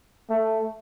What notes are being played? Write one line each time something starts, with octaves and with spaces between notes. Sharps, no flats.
A3